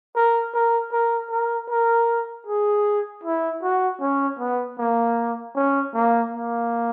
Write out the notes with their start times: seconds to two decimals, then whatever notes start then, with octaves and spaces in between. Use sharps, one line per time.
0.16 A#4
0.54 A#4
0.92 A#4
1.31 A#4
1.69 A#4
2.47 G#4
3.24 E4
3.63 F#4
4.01 C#4
4.39 B3
4.79 A#3
5.55 C#4
5.94 A#3
6.32 A#3